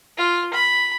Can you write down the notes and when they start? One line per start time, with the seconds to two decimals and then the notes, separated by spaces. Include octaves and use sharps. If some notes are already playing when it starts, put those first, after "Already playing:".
0.17 F4
0.53 B5